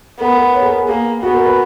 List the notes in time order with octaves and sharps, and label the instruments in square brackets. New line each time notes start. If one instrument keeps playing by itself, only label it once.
[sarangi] B3 [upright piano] A#4
[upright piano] B4
C#5
G#4
A#4
G#4
[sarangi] A#3 [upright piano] G#4
[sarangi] B3 [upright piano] F#4
[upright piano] A#4
B4